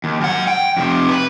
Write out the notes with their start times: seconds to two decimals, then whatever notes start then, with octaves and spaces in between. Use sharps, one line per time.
0.04 D#2
0.21 F#2 F#5
0.47 G5
0.77 F2 C3
1.08 B4